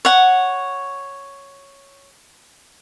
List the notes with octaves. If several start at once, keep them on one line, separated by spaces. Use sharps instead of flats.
C#5 F#5